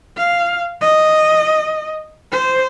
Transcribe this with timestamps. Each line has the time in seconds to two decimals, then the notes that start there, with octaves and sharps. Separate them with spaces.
0.17 F5
0.81 D#5
2.32 C5